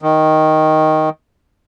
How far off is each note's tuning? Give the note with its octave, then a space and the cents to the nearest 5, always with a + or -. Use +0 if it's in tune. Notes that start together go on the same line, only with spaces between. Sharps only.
D#3 +5